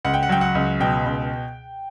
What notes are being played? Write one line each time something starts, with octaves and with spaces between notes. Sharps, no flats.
C#2 F#5
G5
F#5
F#3 G5
F#5
C#2
B2 G5
C#2